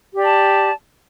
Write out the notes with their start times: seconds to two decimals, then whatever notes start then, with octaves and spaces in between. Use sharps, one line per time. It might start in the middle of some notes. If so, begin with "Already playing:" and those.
0.14 G4
0.18 D5
0.23 A5